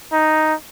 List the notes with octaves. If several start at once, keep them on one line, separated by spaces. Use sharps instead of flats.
D#4